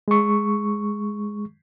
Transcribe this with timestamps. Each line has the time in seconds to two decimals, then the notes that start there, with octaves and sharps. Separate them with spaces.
0.08 G#3 C#6